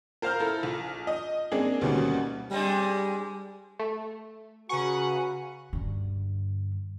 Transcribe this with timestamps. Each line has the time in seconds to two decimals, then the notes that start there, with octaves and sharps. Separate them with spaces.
0.22 A#4 C5 F5 A#5 F6 G6
0.40 E4 A4 A#5
0.63 A#1
1.07 D#5
1.52 G#3 A#3 C4 D4 D#4 G#4
1.81 D2 B2 D#3 G3 A#3 C#4
2.51 G3 G#3 C4 D4
3.79 A3
4.69 C#3 F#4 B4 F#5 G#5 A#5 C#6
5.73 G2 D3